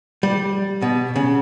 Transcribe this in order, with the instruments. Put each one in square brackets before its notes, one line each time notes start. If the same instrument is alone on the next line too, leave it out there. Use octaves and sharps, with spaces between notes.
[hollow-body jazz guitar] G3
B2
C#3